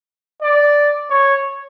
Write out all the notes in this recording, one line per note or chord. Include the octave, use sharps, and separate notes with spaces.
D5
C#5